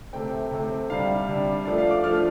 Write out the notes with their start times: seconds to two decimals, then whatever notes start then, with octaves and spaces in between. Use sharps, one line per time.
0.13 C3 A3 C4 G5
0.51 C3 A3 C4
0.90 C3 G3 D4 F5
1.28 C3 G3 D4
1.65 F3 A3 D4 D5
1.78 F5
1.91 D6
2.04 F3 A3 D4 F6